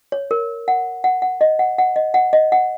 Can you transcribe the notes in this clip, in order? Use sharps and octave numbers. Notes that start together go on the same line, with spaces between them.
C#5
A#4
F#5
F#5
F#5
D#5
F#5
F#5
D#5
F#5
D#5
F#5